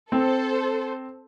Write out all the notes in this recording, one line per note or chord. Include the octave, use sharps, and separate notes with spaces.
C4 A4 C5